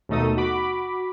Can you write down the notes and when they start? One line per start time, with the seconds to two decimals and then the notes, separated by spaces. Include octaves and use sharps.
0.09 D#2 B2 A3 D#4 A4 D#6
0.37 F#4 B5 D6